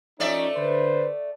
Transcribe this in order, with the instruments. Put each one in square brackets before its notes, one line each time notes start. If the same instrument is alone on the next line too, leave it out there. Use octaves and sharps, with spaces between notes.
[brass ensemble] F3 C#4 D#4 [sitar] A3 D5 E5
[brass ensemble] D3 B4 C5